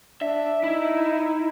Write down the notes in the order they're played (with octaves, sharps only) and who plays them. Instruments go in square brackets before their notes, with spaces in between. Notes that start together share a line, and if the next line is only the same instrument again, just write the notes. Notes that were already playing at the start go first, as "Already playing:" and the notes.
[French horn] D4 [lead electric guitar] E5
[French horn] D#4 [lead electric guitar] E4